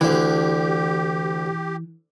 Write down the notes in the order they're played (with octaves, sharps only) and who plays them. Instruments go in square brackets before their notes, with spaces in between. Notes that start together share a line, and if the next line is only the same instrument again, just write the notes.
[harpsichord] D2 D3 [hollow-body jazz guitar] E3 [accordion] G4